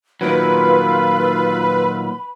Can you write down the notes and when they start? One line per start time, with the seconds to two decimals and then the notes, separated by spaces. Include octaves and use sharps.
0.21 A#2 D#3 F#3 F4 B4 B5 E6